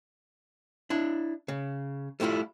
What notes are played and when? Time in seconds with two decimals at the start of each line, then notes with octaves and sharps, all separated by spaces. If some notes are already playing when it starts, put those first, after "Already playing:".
0.90 D4 E4
1.48 C#3
2.20 G3 A3 B3 E4 F4